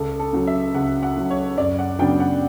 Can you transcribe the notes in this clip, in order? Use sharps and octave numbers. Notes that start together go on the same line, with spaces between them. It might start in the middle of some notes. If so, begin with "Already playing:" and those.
Already playing: C#2 A4
A4
C#3 F#3
E5
C#2 F#5
F#5
C#3 F#3
C#5
F#2 D5
F#5
C#3 F#3 B3 D4 G5
F#5